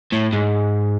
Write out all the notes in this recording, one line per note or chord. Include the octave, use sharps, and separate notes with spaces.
A2
G#2